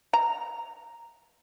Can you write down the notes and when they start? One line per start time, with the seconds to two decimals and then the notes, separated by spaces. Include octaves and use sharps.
0.13 A#5